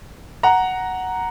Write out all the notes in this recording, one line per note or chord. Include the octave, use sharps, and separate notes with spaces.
F#5 A#5